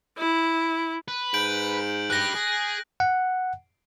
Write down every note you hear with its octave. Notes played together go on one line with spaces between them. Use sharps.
E4
B4
G#2 G6 D7 F#7
G4 B4 F#6 A#6
G#4
F#5